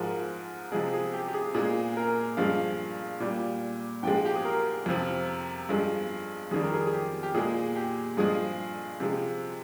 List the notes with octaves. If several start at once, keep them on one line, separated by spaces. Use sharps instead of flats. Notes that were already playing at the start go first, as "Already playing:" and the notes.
Already playing: G#2 F3 G#3 A#4
C3 F3 G#3 G#4
G#4
G4
G4
G#4
A#2 G#3 G#4
A#4
G2 F3 G#3 F5
A#2 G3
G#2 F3 G#3 G5
G4
G#4
A#4
F2 C3 F3
G2 F3 G#3
F2 D#3 G3 G#4
A#4
G#4
G#4
G4
G4
A#2 G#3 G#4
G4
G2 F3 G#3 G#4
C3 F3 G#3